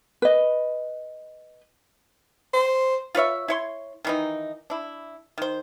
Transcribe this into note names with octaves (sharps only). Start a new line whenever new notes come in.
B4 D#5
C5
F4 B4 C#5 E5
E4 C#5 C6
D#3 E3 D#4
D4 E4
D#3 C5